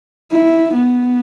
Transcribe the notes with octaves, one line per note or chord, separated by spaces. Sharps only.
E4
B3